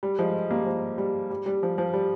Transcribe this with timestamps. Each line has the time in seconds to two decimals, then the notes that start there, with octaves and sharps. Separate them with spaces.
0.03 G3
0.19 F3 G#3
0.51 G3 A#3
0.66 F3
0.98 G3
1.30 G3
1.46 G3
1.63 F3
1.78 F3
1.94 G3